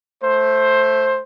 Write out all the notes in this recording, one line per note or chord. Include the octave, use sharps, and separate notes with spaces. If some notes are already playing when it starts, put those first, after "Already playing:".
A3 C5